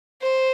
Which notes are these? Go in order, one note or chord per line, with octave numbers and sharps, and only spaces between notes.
C5